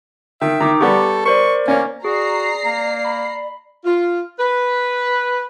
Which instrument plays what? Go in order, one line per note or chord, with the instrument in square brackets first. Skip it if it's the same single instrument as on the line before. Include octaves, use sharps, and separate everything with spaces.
[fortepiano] D#3 [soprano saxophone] E5 [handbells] G5
[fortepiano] D#3 [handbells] A#5 D6
[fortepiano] G3 B3 G4 [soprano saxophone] A4 [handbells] C#6
[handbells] A#4 C5 D5 [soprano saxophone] C#6
[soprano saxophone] A#3 [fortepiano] C#4 C#5
[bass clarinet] F#4 [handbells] G#4 [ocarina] D5 [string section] A#5 C7
[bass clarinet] A#3
[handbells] B5
[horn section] F4
B4